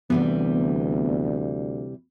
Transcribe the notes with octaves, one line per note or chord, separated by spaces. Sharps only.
D2 C3 E3 G3 B3